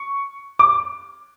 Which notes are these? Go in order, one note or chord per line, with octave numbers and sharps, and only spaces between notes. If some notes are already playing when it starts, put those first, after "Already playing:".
Already playing: C#6
D6